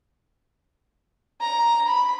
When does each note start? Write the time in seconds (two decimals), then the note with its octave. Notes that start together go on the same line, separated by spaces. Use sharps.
1.41 A#5
1.88 B5